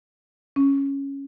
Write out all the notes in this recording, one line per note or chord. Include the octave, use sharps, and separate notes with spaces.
C#4